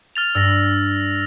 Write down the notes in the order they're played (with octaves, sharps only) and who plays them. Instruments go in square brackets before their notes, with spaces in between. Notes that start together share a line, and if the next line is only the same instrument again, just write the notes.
[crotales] F6 A6 F7
[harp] G2 [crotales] E6 A6 A#6